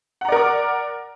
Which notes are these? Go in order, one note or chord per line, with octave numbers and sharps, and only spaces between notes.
A#4 D5 F#5 A#5 D6